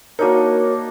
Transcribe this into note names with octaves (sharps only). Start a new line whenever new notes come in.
A#3 D4 D#4 F#4 A#4 C#5